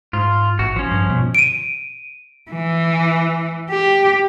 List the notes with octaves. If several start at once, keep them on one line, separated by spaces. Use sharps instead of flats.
G#2 F4
A1 F#4
F3 C#4
G2
B2
D7 D#7
E3
G4